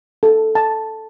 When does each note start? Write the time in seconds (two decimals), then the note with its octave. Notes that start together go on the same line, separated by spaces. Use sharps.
0.23 A4
0.55 A5